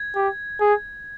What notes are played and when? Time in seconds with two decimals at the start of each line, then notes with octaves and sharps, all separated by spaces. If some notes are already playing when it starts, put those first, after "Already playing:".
Already playing: G#6
0.15 G4
0.60 G#4